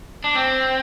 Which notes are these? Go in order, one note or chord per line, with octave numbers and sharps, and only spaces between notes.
D4
C4